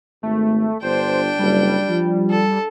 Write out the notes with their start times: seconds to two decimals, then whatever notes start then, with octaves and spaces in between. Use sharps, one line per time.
0.23 G#1 A3
0.83 G1 D4 C5 G5
1.39 F#1 G3
1.89 F3
2.30 A4